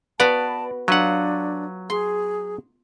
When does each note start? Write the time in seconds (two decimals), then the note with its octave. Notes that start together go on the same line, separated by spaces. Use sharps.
0.20 B3 F#4 B4 D5 A5
0.88 F#3 D4 F4 B4 F5 F#5
1.90 G#4 C6